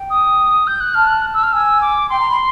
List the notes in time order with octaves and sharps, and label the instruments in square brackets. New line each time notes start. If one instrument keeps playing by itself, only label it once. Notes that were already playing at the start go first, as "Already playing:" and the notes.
Already playing: [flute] G5
[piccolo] D#6
G6
F#6
[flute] A5 [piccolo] F6
[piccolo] F#6
E6
F6
[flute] G#5 [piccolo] E6
[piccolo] D6
[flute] G5 [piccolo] C6
[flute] A#5
B5